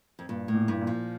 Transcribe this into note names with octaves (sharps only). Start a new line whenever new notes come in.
F2
G2 A#2
A2
A#2
G2
A#2
F3